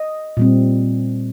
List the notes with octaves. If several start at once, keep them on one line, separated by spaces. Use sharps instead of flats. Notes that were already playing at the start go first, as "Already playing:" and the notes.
Already playing: D#5
A#2 G3 C4